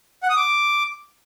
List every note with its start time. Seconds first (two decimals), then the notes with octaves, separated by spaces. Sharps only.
0.23 F#5
0.30 D#6
0.36 D6